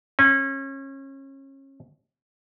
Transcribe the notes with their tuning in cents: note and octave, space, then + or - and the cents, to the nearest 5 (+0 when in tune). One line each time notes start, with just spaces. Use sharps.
C#4 -30